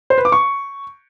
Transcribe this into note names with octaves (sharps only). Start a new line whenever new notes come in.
C5
B4
D6
C#6